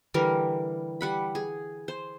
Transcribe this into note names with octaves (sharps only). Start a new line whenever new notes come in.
D3 E3 G3 A#4
G3 F#5 B5
G#4
C5